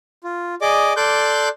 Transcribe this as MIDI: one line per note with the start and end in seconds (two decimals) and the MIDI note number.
0.24 0.55 65
0.61 0.93 68
0.61 0.93 74
0.61 0.93 75
0.61 0.93 86
0.97 1.49 69
0.97 1.49 74
0.97 1.49 84
0.97 1.49 86
0.97 1.49 90
0.97 1.49 91